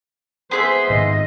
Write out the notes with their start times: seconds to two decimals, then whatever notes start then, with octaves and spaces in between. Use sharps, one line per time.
0.51 B3 G#4 C5 E5 C6
0.90 G#2 D#3 D#5